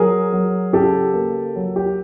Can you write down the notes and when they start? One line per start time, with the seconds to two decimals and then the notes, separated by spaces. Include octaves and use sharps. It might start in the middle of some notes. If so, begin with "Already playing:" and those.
Already playing: F#3 G#4 A#4
0.32 F#3
0.73 C#3 G4 A4
1.14 A#3
1.56 F#3
1.76 G4